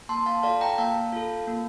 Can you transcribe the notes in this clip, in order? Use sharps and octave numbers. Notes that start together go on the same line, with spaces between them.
A#3 A5 C6
F5 A5
F4 A4 D5 F5
G5 A#5
A#3 F5 A5
F4 A4
A#3